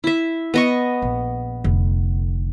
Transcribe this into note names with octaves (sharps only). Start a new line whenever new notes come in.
E4 E5
B3 D#5 C#6
A#1
F1 D3